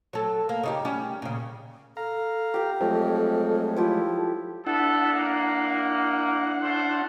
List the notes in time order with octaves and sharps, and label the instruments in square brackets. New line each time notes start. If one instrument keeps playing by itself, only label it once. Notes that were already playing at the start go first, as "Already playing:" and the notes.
[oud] F#3 A4
A#3
C#3 D#4 G4
G3 C#4 G4
A#2 C#3
[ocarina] A4 [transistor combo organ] F5 A#5
[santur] G4 G5
[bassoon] F2 [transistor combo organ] F#3 G#3 A3
[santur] F3 E4 G4
[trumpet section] B3 A4 [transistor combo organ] D4 E4 F#5
[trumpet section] A#3
C#4 A4 C5